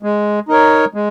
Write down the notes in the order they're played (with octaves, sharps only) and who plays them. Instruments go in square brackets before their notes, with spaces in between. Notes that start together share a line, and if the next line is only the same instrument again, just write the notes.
[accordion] G#3
D#4 A#4 C#5
G#3